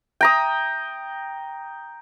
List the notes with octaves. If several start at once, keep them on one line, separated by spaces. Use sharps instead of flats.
G5 A#5 D#6